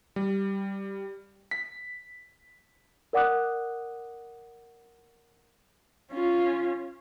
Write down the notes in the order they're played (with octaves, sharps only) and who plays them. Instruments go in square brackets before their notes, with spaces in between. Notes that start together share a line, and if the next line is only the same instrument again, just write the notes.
[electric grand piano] G3
B6
[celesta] A#4 D5 F#5 D6 D#6 F#6
[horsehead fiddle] C#4 F4